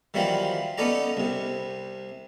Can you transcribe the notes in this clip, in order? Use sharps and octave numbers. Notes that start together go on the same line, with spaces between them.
D#3 E3 F#3 G3 C4 F4
B3 C#4 D#4 A4 D5 A#5
C2 C3